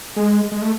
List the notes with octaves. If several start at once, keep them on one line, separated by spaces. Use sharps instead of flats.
G#3
G#3
A3